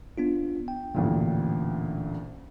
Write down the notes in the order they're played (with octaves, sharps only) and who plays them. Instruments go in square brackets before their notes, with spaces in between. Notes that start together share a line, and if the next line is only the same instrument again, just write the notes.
[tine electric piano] B3 D4 F4
G5
[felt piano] A1 D2 A#2